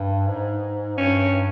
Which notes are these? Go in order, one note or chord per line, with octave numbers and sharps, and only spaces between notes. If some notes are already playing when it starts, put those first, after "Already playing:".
Already playing: G2
G#2
G2 C#4